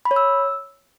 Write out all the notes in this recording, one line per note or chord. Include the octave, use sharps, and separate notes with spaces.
B5
C#5
E6